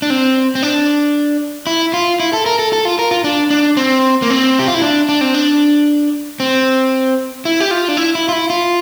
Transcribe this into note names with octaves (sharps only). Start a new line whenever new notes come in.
D4
C4
C4
D4
E4
F4
E4
A4
A#4
A4
A4
F4
A#4
F4
D4
D4
C4
A#3
C4
G4
F4
E4
D4
D4
C4
D4
C4
E4
G4
F4
D4
E4
E4
F4
E4
F4